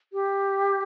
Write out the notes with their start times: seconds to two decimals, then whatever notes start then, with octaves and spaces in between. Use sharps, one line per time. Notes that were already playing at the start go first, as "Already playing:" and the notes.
0.13 G4